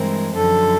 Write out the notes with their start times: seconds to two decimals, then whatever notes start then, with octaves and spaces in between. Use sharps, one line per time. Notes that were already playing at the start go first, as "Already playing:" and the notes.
Already playing: G2 E3 G#3 C4 A#4
0.33 F#2 D3 F3 A4